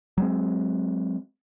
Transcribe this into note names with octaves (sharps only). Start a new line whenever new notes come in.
F#3 G#3 C4